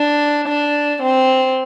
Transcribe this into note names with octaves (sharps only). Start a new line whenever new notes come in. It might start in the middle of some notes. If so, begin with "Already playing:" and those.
Already playing: D4
D4
C4